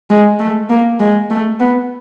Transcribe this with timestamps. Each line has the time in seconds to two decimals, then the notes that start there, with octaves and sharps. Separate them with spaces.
0.10 G#3
0.39 A3
0.70 A#3
1.00 G#3
1.30 A3
1.60 B3